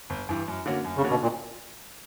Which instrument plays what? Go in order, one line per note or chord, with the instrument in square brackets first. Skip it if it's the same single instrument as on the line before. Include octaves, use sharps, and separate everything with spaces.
[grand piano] G1
G2 E3
F#2
D3 A#3 C#4 F#4
F#2
[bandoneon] C#3
[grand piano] D3 A#3 C#4 F#4
[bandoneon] B2
A#2